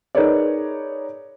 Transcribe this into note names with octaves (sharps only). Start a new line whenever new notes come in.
D#4 G#4 A#4 B4 C#5 D5